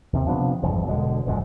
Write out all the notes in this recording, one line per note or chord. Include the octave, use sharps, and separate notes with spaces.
D#2 C3
C3 F3 B3 D4
G#1 E2 G2 F3
E1 B2 D3 G#3
D#1 F#2 A#2 G#3